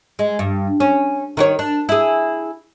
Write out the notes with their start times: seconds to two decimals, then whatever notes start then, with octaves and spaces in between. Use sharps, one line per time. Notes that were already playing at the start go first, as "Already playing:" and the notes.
0.19 G#3
0.39 G2
0.80 C#4
1.37 D#3 F#4 C#5
1.59 D4
1.89 E4 G#4